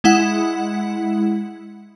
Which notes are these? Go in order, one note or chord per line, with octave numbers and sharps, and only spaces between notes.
G#3 E4 F#5